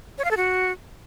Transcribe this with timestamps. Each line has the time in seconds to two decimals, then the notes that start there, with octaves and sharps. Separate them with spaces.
0.18 C#5
0.25 F5
0.31 A4
0.37 F#4